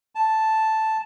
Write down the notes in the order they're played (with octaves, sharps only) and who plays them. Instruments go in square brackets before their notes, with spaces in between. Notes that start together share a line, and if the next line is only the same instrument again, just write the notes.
[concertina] A5